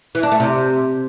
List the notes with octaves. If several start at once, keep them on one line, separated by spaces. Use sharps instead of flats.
E3
D4
A3
C3